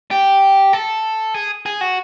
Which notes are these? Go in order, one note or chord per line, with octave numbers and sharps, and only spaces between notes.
G4
A4
G#4
G#4
F#4